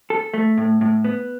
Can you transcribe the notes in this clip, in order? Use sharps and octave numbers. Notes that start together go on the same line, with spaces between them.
A4
A3
A2
A2
B3